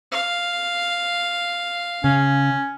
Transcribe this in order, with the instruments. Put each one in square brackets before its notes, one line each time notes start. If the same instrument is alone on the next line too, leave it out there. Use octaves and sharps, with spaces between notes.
[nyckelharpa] F5
[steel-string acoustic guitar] C#3 [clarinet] C#4